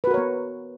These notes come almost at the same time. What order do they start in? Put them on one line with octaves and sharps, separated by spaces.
B4 F#4 A#4 C#5 B3